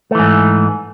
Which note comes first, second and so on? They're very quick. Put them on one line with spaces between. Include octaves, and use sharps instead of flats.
A3 E3 G#2